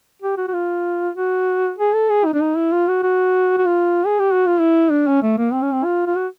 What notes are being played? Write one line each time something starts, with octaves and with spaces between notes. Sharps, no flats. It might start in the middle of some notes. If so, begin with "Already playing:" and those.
G4
F#4
F#4
F4
F#4
G#4
A4
G#4
D#4
D4
D#4
E4
F4
F#4
F#4
F#4
F4
G#4
G4
F#4
F4
E4
D4
C#4
A3
A#3
C4
C#4
C4
F4
F4
F#4